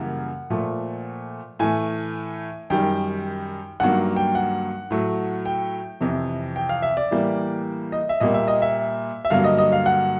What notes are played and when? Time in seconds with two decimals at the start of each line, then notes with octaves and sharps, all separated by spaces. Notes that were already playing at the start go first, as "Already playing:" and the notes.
Already playing: F#2 C#3 E3 G3 A#3 F#5
0.50 A#2 F3 A3
1.59 A2 E3 A3 G#5
2.70 F#2 D#3 G3 G5
3.80 G2 D#3 F#3 A#3 F#5
4.16 G5
4.35 F#5
4.90 A2 F#3 A3
5.46 G5
6.00 F2 C3 E3
6.56 G5
6.69 F5
6.82 E5
6.97 D5
7.11 A2 E3 G3 A#3
7.92 D#5
8.09 E5
8.20 A#2 G3 A#3 D#5
8.34 E5
8.48 D#5
8.62 E5
9.25 E5
9.30 G2 D3 F#3 A#3 F5
9.44 D#5
9.58 D#5
9.72 F5
9.86 F#5